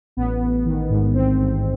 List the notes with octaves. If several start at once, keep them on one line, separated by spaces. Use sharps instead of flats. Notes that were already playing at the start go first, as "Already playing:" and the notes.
A1 B3
A1
D#3
G#2
A1 C4
A1